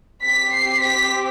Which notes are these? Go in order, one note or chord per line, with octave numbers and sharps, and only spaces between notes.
C4 G4 B6
C7
B6